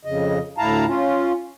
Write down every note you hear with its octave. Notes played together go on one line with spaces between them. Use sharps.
F2 C#3 D#5
D2 A2 E4 F5 A5 A#5
C#4 F4